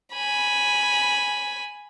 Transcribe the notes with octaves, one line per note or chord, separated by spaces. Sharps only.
G#5 B5